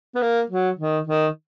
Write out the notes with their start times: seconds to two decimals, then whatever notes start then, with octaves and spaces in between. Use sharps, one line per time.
0.15 B3
0.22 A#3
0.50 F#3
0.79 D#3
1.07 D#3